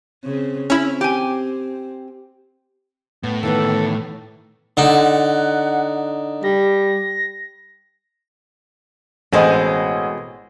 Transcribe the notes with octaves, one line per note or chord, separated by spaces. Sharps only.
C#3 C4
C4 C#4 E4
G4 G#5
A2 B3
D#3 E3 B3 A4
D3 D#4 F#5
G3 A#6
A1 B2 G#3 C4 C5 D#5